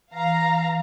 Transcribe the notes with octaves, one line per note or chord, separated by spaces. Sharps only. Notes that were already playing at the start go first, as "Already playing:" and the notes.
E3 F5 A#5